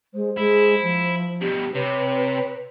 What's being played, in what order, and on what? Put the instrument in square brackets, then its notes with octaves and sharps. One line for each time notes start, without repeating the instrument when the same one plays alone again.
[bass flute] G#3 [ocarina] C5
[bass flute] G#3 [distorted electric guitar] E4
[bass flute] F3
[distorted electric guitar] G2 B2 [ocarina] G4
[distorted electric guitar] C3 [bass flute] B4 [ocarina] C#5